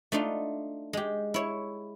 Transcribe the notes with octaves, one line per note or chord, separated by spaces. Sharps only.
A3 D4 D#4 F4
G#3 G4
E4 C#5